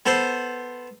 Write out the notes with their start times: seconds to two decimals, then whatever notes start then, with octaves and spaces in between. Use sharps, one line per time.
0.06 B3 A4 C5